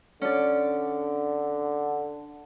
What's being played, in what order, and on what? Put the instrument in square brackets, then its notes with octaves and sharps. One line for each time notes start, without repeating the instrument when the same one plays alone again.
[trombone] D3 [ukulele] C#4 D5